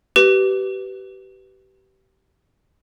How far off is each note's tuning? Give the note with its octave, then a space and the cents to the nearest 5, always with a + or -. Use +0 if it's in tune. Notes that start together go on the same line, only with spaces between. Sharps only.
G4 -30 B4 +0